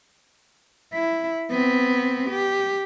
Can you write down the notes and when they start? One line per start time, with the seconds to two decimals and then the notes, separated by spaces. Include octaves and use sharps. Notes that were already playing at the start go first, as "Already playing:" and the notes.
0.94 E4
1.51 B3 C4
2.30 G4